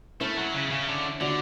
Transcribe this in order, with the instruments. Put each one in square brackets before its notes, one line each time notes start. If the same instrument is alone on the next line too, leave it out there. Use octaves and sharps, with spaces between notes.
[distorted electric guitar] A3 [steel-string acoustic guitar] C#4 E4
[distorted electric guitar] F#3
C#3
C#3
D3
[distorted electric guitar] D3 [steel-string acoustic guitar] D4 F#4